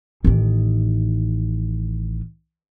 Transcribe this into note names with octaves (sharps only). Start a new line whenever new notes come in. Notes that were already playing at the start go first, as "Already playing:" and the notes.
A1 D#3